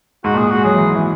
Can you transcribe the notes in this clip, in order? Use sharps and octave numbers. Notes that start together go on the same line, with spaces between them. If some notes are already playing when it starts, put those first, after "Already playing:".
G#2 F#4
A#2
G#4
G#3 F#4
F#3 G#4
E3
F#3
E3